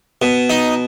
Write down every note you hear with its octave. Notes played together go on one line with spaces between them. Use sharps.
B2
D#4